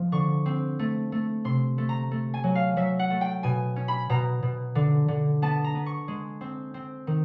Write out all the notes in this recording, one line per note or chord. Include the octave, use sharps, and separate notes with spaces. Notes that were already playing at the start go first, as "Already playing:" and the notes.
Already playing: F3 G#3
D3 C#6
C4
A3
A3
C3 C6
A3
A#5
A3
G#5
F#3
F5
F#3 E5
F#5
A3
G5
B2 G#5
C#4
B5
B2 A#5
B2
D3
D3
B3 A5
A#5
B3
C#6
G#3
C4
C4
D#3